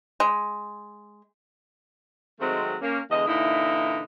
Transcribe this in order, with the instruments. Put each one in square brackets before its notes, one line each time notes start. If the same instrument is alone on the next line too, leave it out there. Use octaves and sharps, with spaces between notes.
[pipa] G#3
[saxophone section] D#3 F#3 G#3 A3 C4
A#3 C#4
E2 D3 G#3 D#5
A#2 D3 E3 D#4 E4 E5